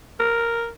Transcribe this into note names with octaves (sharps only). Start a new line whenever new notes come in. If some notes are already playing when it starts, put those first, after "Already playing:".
A#4